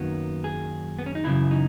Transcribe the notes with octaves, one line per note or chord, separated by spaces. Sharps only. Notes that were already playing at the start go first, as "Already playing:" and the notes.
Already playing: F#2 D#3 F#3 A#3 B3
G#4
B3
C#4
D#4
F#2 C#3 E3 E4
D#4